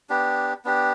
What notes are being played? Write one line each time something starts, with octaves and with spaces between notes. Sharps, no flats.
B3 D4 G4
B3 D4 G4